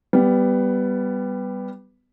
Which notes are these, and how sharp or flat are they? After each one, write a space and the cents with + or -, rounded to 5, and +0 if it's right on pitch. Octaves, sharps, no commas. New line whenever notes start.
G3 +0 B3 +10